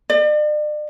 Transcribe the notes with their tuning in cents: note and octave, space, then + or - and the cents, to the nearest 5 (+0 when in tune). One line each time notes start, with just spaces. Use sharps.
D5 +40